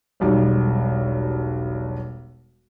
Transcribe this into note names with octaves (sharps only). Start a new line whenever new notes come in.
E1 B1 G3